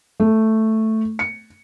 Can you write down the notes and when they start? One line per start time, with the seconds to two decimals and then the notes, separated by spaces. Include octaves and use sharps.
0.20 A3
1.19 C#7